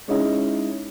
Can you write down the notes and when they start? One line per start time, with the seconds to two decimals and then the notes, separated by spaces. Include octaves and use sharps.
0.08 G#3 C#4 D#4 E4